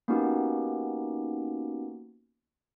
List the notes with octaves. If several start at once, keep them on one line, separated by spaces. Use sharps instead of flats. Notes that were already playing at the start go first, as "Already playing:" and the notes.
A#3 B3 C#4 D#4 F#4 G4